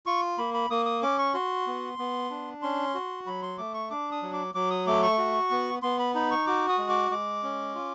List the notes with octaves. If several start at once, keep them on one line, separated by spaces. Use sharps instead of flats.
F4 C#6
A#3 B5
B5
A#3 D#6
D#6
C#4 D6
C#6
F#4 C6
B3
B3
D4
C#4 C6
F#4
F#3 B5
C6
A3 D6
C#6
D4 D6
D#6
F#3
D6
F#3 D6
D#6
A3 D6
C#6
F#4
B3
B3 C6
B5
D#4 B5
C#6
F#4 D6
D#6
G#3
D6
G#3 D6
C#4
F4